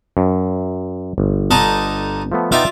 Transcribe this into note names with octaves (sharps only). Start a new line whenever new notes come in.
F#2
G1
D3 D#4 A5
F3 A3 B3
B3 D#4 F4 D5 E5 G5